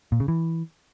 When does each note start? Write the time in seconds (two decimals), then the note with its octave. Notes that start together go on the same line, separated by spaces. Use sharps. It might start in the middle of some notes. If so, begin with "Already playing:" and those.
0.12 A#2
0.20 C#3
0.28 E3